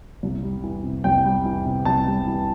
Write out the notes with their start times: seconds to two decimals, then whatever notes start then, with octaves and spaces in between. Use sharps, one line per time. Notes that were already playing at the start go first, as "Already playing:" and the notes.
0.23 C2
0.43 G3
0.64 E3
0.83 C3
1.04 C2 G5
1.25 G3
1.45 E3
1.65 C3
1.85 C2 A5
2.06 G3
2.27 E3